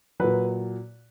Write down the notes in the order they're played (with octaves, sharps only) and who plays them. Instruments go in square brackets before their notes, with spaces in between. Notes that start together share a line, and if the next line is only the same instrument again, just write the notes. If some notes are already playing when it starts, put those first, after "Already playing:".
[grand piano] A#2 F#3 B4